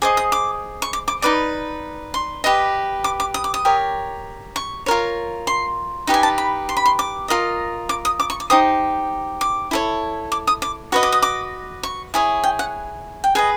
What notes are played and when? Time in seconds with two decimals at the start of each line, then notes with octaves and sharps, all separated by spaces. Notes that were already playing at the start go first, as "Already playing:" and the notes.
0.02 G#4 C5 D#5 D6
0.17 D#6
0.32 D6
0.82 C#6
0.93 D6
1.08 D6
1.22 D#4 F#4 B4 D5 D6
2.14 C6
2.44 G4 B4 D#5
3.04 D6
3.20 D6
3.34 D#6
3.44 D6
3.54 D#6
3.65 G4 A#4 C#5
4.56 C#6
4.86 F4 A#4 C#5
5.47 C6
6.07 D#4 G4 B4 D5
6.14 G#5
6.23 A5
6.38 B5
6.69 C6
6.77 B5
6.86 C6
6.99 D6
7.28 F4 A#4 D#5
7.89 D6
8.05 D#6
8.20 D6
8.30 C#6
8.40 D6
8.50 D#4 G4 C5 D#6
9.41 D6
9.71 E4 A4 C#5
10.32 D6
10.47 D#6
10.62 D6
10.92 F#4 B4 D#5 C#6
11.03 D6
11.12 D#6
11.22 D6
11.83 C#6
12.14 E4 G#4 C#5
12.44 G5
12.59 F#5
13.24 G5
13.35 G#4 B4 D#5 G#5